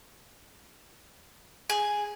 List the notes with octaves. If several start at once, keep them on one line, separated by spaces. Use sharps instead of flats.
G#4